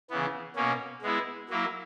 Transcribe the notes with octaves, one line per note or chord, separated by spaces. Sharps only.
C#3 E3 B3
B2 A#3 C#4
G#3 B3 E4
F#3 A#3 E4